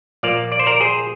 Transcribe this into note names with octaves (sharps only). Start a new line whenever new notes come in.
A#2 F3 A#3 D5 F5
D5
C5
A#4 D5
G#4 C5